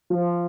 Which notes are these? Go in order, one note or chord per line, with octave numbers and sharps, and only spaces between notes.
F3